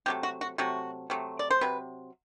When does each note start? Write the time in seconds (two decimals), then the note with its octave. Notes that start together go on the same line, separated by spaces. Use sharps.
0.06 C3 F#3 A3 G4
0.23 F#4
0.41 F#4
0.58 C3 F#3 A3 F#4
1.10 C3 F#3 A3
1.39 D5
1.51 C5
1.61 C3 F#3 B4